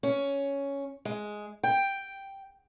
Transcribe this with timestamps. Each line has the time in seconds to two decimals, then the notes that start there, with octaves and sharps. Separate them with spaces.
0.03 C#4
1.05 G#3
1.63 G5